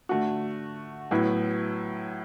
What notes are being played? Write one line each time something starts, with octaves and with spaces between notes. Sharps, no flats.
D3 A3 F#4
A2 F#3 B3 E4